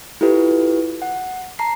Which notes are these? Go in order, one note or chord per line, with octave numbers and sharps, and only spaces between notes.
E4 F4 G4 A4 B4
F#5
A5 A#5 C7